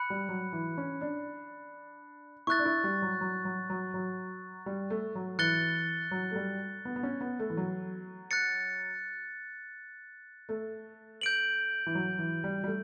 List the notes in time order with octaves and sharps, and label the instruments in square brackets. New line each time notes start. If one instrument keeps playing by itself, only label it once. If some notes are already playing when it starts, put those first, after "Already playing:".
Already playing: [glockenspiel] B5 F#6 C#7
[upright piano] G3
F#3
E3
C#4
D4
[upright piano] E4 [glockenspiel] C#6 F#6 A6
[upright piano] D4
E4
G3
F#3
F#3
F#3
F#3
F#3
G3
A3
F#3
[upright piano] E3 [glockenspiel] F#6 A6 C#7 G7
[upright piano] F#3
A3
G3
B3
B3
C#4
B3
A3
E3
F#3
[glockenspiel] F#6 A6 C#7
[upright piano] A3
[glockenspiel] G6 D7 F#7
[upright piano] E3
F#3
E3
G3
G3
A3